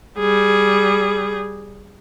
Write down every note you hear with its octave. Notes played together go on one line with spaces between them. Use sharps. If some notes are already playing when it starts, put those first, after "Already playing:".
G3 G#4